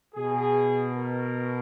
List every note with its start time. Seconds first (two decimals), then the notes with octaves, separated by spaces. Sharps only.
0.15 B2 G#4
0.94 A#4